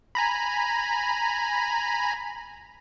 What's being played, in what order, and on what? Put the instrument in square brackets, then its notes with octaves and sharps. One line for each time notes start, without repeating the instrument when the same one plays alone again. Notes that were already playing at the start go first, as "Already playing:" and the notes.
[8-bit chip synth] G#5 A#5 B5